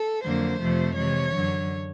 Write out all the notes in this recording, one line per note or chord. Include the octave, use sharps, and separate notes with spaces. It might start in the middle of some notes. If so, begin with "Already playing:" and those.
Already playing: A4
F2 D3 F#3 A#3 C5
F2 C3 F3 A3
C3 E3 G#3 C#5
F#2 D3 F#3